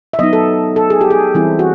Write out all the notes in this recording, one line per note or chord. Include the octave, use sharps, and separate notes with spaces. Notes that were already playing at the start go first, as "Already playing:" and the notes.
E5
F#3 B3 D#4 D#5
A4
A4
G#4
G4
G#4
E3 G3 C4 E4
F#4